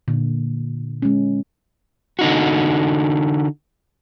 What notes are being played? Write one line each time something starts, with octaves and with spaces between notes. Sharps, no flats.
A#2 D3
G#3 C#4
D3 D#4 F#4